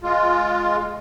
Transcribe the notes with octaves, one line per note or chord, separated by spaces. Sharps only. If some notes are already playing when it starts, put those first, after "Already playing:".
G#3 F4